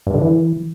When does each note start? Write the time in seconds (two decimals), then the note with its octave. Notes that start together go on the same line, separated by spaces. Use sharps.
0.07 G2
0.14 D3
0.22 E3